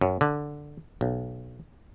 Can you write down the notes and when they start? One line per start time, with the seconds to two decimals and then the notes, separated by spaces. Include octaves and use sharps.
0.01 F#2
0.21 D3
1.01 B1